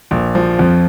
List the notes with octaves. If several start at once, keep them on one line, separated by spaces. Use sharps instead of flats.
A#1
F3
F2